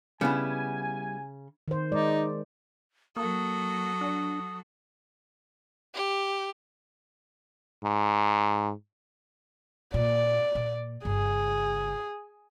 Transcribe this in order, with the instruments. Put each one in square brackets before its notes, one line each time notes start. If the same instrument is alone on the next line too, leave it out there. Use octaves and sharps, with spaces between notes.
[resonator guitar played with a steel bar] C#3 [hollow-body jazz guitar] G3 B3 E4 [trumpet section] G#5
[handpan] D#3 C5
[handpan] G#3 D5 [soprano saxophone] D#4
[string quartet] F#3 F#4 A4 [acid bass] A#3 [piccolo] D#6
[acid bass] D4
[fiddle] G4
[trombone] G#2
[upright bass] A#2 [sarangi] D5
[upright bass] A#2
[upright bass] G1 C#3 [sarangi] G#4